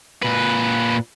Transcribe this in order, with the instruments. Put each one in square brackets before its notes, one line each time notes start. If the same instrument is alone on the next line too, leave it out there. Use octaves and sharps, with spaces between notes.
[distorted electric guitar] A#2 B4